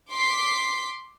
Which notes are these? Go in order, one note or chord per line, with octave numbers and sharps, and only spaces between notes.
C6 D6 B6 C7